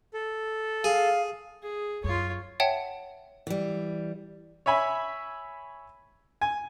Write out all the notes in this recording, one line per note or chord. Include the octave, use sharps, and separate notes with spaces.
A4
G#4 F5
G#4
F#2 F4 C#5
C#5 E5 F#5 G5 A5
E3 G3
C#5 E5 G#5 B5
G#5